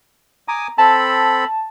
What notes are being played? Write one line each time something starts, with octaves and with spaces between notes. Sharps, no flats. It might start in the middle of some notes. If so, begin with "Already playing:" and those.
G#5 A#5 D6 D#6
C4 A4 A5 B5